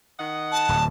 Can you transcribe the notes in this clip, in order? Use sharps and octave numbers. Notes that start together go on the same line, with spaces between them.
D#3 D#5 F#5
A5
D1